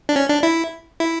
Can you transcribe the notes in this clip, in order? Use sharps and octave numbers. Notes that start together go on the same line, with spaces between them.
D4
C#4
D4
E4
E4